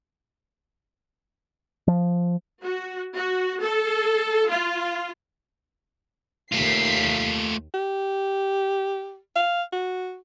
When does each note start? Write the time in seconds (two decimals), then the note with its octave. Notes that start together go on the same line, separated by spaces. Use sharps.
1.88 F3
2.62 F#4
3.16 F#4
3.62 A4
4.50 F4
6.52 D#2 A3 F4 B6 C7
7.74 G4
9.36 F5
9.73 F#4